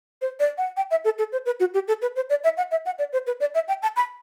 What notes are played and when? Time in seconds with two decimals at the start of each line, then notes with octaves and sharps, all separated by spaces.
0.22 C5
0.40 D5
0.58 F#5
0.77 G5
0.91 E5
1.05 A4
1.18 A4
1.32 C5
1.46 B4
1.60 F#4
1.74 G4
1.88 A4
2.02 B4
2.16 C5
2.30 D5
2.44 E5
2.57 F#5
2.71 E5
2.86 F#5
2.99 D5
3.13 C5
3.27 B4
3.40 D5
3.55 E5
3.68 G5
3.82 A5
3.96 B5